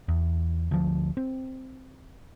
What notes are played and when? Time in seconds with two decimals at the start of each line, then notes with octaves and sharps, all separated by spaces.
0.08 E2
0.71 D2 F3
1.17 C4